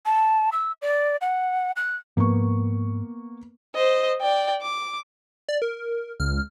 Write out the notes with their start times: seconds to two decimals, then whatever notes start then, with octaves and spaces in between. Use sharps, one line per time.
0.06 A5
0.52 E6
0.82 D5
1.21 F#5
1.76 F#6
2.17 G#2 F3 A#3 B3 C#6
3.75 C5 D#5
4.21 D5 G5
4.62 D6
5.49 D5
5.62 A#4
6.20 C#2 F6